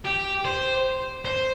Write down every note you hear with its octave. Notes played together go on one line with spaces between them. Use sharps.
G4
C5
C5